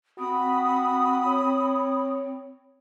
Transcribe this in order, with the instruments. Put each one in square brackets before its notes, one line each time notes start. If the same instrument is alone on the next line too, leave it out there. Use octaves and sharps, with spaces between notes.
[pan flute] C4 [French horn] F#4 [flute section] B5 D#6
[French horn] C#5